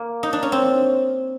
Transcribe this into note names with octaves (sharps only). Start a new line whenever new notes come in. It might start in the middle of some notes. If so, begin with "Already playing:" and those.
Already playing: A#3
D#4
D4
C#4
C4